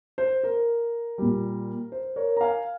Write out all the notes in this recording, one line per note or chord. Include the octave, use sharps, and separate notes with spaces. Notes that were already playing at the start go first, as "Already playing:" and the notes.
C5
A#4
A#2 G3
C5
A#4 C#5
A#5
F5 G#5